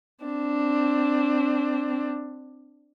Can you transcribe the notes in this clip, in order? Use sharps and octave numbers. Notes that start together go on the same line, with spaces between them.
C4 D4